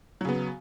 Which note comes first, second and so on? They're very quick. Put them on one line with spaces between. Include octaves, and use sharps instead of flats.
F#3 C#3 B3